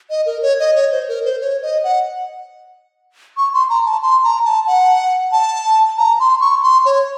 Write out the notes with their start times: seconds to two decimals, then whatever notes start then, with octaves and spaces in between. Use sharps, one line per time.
0.10 D#5
0.26 A#4
0.42 C#5
0.59 D#5
0.75 C#5
0.91 C5
1.08 A#4
1.25 C5
1.41 C#5
1.62 D#5
1.84 F#5
3.37 C#6
3.54 C6
3.70 A#5
3.86 A5
4.02 C6
4.24 A#5
4.45 A5
4.67 F#5
5.32 A5
5.98 A#5
6.20 C6
6.41 C#6
6.63 C6
6.86 C#5